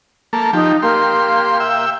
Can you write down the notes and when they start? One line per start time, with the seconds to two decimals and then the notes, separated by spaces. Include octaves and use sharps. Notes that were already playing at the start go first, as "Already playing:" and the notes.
0.33 A#3 A4
0.53 F3 D#4 G4
0.82 A#3 G4 C6
1.60 E5 G5